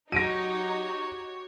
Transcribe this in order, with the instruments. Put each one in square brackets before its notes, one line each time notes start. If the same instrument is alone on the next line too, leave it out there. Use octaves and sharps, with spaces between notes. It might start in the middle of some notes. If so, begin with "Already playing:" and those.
[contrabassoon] F#3 [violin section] D#4 [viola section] F#4 G4 C#5 [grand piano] A#6 D7 D#7